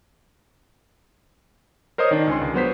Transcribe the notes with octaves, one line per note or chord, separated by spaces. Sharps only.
A#4 C5 C#5 D#5 D#6
D#3 D4
C#2 G#5 C6
C#2
F#3 B3 C5 B6